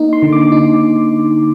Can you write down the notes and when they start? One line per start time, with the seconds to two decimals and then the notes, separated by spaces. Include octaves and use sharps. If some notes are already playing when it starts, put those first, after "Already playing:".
Already playing: A#3 D#4
0.13 C6
0.22 D3
0.33 D6
0.52 D#4